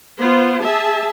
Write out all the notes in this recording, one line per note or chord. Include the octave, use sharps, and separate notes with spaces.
B3 F4 C5
G#4 E5 A5